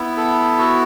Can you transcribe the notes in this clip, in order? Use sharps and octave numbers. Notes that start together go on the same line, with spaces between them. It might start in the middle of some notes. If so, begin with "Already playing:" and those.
Already playing: B3 E4
A4
F#4